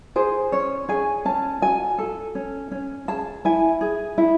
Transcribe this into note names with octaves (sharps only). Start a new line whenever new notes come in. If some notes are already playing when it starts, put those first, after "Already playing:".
G#4 C5
C#4 C#5
G#4 G#5
C#4 A5
F#4 G#5
A4
C#4
C#4
G#4 A5
E4 G#5
G#4
E4